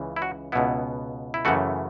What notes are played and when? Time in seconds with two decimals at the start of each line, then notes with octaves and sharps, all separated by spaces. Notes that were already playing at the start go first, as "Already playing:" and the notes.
Already playing: C#2 C#3 E3
0.16 E4
0.22 F#4
0.52 C#2 B2 B3 E4
1.34 E4
1.45 F#2 C#3 E3 A3 F#4